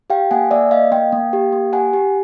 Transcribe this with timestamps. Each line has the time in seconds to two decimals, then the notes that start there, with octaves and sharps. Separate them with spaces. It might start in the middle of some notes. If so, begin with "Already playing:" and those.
0.10 G4 F5 G5
0.31 A#3 F#5 G#5
0.51 A#3 D5 E5
0.71 A#3 D#5 F5
0.92 A#3 F5 G5
1.12 A#3
1.33 G4
1.53 A#3
1.73 G4 F#5 G#5
1.93 G4